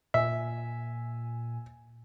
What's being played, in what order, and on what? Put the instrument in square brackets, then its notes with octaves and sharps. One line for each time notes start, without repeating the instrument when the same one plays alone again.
[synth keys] A#2 G#5 [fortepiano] E5